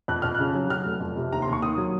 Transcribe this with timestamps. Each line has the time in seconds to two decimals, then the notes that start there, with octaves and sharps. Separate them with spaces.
0.08 F2 F#6
0.22 F2 F6
0.35 C#3 F#6
0.55 F#3
0.70 F#3 F6
0.85 F1
1.00 F2
1.17 C3
1.32 D#2 A#5
1.42 C6
1.48 D#2
1.53 C#6
1.62 D#3 D#6
1.78 F#3